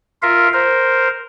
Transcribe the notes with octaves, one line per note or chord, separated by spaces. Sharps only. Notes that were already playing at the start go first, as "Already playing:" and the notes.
F4 A#4 E5 F5
A#4 C5